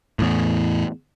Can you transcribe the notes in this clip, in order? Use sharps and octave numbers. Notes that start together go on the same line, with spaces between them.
E2 A2